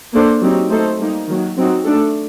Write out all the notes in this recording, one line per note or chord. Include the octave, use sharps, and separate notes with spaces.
A#3 D4 A4 C5
F#3 C4 D#4 G4
A3 D#4 A4 C5
G3 A#3 D#4
D#3 F#3 A#3
F#3 C4 D#4 F#4
A3 D4 A4